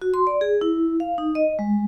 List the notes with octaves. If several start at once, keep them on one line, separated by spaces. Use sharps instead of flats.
F#4
C6
D5
G#4
E4
F5
D#4
D#5
G#3